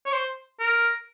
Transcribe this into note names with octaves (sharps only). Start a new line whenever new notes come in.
C#5
C5
A#4